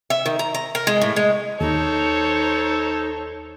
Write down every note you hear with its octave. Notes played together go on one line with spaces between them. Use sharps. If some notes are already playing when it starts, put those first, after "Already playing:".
E5
D#3
A#5
A#5
A#4
G#3
A2
G#3
D#2 D#4 A4 C5 C#5